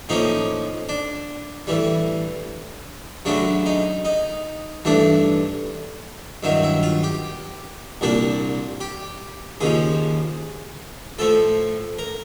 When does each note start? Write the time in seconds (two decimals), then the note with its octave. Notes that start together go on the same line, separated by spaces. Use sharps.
0.09 A2 F3 A#3 C#4 D#4
0.89 D4
1.67 A2 E3 G3
3.25 F#2 C#3 F#3 A3 D4
3.66 D#4
4.05 D#4
4.85 G2 E3 A3 D4
6.43 G2 D#3 F#3 E4
6.63 E4
6.83 F4
7.03 G4
8.01 C2 A#2 G3 A#3 D4
8.80 G4
9.61 D#2 C#3 F3 G#4
11.19 A2 F3 A3 A4
11.99 A#4